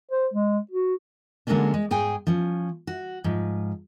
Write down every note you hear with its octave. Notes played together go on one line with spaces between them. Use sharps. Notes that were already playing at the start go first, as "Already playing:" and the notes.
C5
G#3
F#4
D3 F#3 G#3 A#3 C#4 D4
G#3
G#2 G#4 G5 G#5
F3 C#4
F#4
G#2 F3